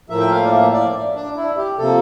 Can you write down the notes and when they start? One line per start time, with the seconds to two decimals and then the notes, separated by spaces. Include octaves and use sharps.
0.10 A2 F3 A#3 E5
0.20 G5
0.31 F5
0.45 D5
0.52 E5
0.73 D5
1.15 D4
1.37 E4
1.57 G4
1.78 C3 F3 A#3 A4